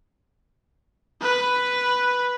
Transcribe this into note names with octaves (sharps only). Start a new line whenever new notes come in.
B4